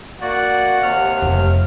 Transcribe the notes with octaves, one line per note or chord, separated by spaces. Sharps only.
A#3 F#4 D5 F#5
D#2 C3 F6
F1 E2